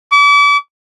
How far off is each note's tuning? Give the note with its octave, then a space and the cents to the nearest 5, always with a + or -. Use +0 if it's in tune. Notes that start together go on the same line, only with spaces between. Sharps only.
D6 -40